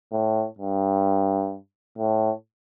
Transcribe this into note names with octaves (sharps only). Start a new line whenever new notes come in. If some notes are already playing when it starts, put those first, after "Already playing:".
A2
G2
A2